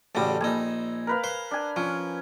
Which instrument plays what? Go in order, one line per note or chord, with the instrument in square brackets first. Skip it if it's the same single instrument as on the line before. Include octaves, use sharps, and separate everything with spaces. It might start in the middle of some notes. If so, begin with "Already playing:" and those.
[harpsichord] A1 C#3 F#4 [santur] G3 A4
[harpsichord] A#1 D#4 [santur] G#5 E6
[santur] A#4 B4 F5
[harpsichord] C5
[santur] D4 G#5
[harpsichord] F3 [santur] C#4